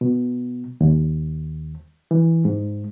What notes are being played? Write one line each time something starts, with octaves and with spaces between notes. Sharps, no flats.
B2
D#2
E3
G#2